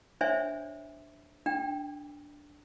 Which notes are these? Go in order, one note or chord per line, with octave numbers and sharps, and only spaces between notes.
D4 C5 C#5 E5 G#5
D4 G5